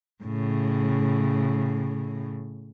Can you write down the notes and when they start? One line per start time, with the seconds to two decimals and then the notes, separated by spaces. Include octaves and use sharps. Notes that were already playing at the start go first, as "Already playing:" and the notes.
0.24 A2 C#3